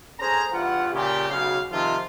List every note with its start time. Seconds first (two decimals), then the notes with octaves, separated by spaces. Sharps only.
0.19 C#4 G#4 A4 C5 A#5
0.52 E2 G2 E3 F4 F#5
0.93 A#2 C#3 G4
1.30 B1 C#3 F#4 F5
1.71 C3 D#3 F3 F4